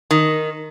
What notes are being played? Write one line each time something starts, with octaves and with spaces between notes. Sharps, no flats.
D#3